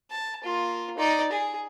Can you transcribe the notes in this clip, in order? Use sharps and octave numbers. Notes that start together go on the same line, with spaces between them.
A5
A#3 F4
D#4 D5
G#4